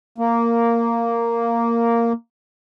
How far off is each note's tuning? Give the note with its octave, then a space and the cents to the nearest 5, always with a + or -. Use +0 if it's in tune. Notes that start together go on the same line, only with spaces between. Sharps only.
A#3 -5